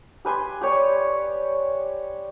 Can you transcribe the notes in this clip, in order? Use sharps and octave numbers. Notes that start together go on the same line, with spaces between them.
G4 B4 G#5 C6
G4 C#5 D5